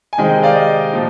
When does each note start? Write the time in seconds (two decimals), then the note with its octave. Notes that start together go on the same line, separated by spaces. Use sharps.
0.13 G#5
0.18 C3 D#3 G#3 C4 D#5 G5
0.43 D5 F5
0.55 D#5
0.93 A#2 F3